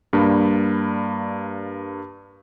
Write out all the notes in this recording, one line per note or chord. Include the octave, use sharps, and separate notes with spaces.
G2 A#3 D4 B5